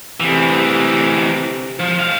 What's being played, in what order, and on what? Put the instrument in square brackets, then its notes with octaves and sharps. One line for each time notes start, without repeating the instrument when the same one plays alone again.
[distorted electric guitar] D2 E3 [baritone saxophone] C3
[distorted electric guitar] F3
D2 F5